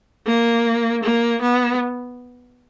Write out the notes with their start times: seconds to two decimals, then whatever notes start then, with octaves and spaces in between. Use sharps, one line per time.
0.26 A#3
1.03 A#3
1.41 B3